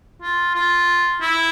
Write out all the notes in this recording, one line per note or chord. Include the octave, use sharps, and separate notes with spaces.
F4
F4
E4